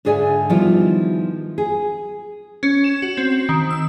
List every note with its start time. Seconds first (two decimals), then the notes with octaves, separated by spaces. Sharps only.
0.05 G#2 D3 G#4 D5 E5 G#5
0.49 D#3 F3 G3 B3 E4 F4
1.58 G#4
2.63 C#4
2.84 E7
3.02 F#4
3.17 C4
3.49 D#3
3.70 E6